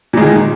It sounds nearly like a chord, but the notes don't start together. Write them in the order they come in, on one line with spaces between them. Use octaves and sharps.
A#2 G#3 D#3